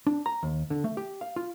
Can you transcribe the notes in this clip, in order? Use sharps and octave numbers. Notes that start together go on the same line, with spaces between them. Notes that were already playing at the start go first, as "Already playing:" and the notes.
D4
A#5
D#2
D3
A3
G4
F5
F4